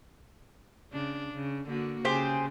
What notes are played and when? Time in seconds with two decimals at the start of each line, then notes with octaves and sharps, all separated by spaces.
0.92 C#3 D4
1.33 C#3
1.66 D3 A#3 F#4
2.05 C#3 G4 G#4 C5